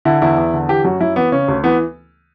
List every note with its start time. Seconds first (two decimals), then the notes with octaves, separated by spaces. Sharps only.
0.05 D3 E4
0.22 E2 E4
0.38 E2
0.54 D3
0.68 E3 G4
0.85 F#2 F#4
1.00 F#2 E4
1.16 E3 B3
1.32 C#3 C#4
1.48 D2
1.64 E3 B3